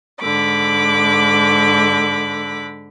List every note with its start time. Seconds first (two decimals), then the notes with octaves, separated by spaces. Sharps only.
0.20 G#2 D3 B5 D6